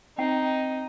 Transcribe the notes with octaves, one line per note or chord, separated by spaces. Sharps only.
C4 D#4 G5 C7